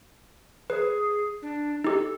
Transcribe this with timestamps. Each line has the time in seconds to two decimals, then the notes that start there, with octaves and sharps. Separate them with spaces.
0.70 G#4 B4
1.42 D4
1.84 D#4 G4 A4